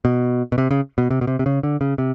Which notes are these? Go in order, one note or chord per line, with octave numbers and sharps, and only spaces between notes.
B2
B2
C3
C#3
B2
C3
B2
C3
C3
C#3
D3
C#3
C3